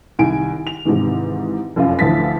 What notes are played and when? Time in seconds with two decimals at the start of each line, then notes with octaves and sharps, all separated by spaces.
0.19 C2 D#3 G#5 D7
0.67 F7
0.85 G#2 C3 D#3 E3
1.76 F1 F#2 F4
1.99 D2 E3 F3 F5 A6 B6